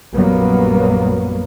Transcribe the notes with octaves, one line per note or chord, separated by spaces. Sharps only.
A#1 F#2 F#3 G3 A#3 B3